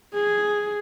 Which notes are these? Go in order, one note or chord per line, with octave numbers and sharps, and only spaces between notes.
G#4